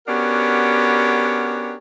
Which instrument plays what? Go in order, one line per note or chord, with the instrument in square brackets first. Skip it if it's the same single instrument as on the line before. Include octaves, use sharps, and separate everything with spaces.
[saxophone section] B3 C#4 D4 F#4 G4 A#4